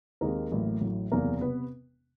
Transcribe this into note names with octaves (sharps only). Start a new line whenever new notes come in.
D#2 D#3 G#3 A#3 C4 A#4
A1 A2 F#3
A1 A2 F#3
F#1 E2 C3 A#3 A#4
C3 B3 B4